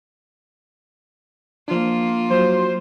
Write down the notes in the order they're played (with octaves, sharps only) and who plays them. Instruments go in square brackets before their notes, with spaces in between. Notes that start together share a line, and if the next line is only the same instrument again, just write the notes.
[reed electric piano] F3 D4 [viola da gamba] A#3 F4
[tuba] F#3 [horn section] C5